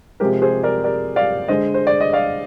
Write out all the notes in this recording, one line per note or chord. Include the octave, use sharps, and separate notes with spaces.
C3 F3 G#3 G4 A#4
G#4 C5
A#4 D5
A#4 D5
D5 F5
D3 G#3 C5 D#5
C5
D5
D#5
D5 F5